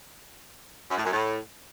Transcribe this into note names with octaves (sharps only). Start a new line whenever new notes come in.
F#2
A2
F#2
A2